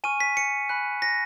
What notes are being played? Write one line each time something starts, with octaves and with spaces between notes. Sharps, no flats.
G#5 C#6 F6 D#7
B6
C#7
G#5 B5 F#6
A#6